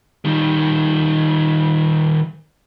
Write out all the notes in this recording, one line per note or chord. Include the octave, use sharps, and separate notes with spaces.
D#3 G3